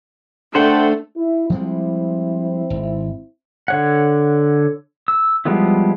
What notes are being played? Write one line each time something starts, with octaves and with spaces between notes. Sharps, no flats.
A3 D4 C5 F#5 G5
E4
F3 G3 G#3 C4 E4
G#1
D3 C#5 F#5
E6
F3 G3 G#3 B3 E4